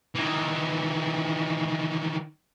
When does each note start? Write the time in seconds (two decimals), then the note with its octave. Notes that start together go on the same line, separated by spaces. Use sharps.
0.16 D#3 E3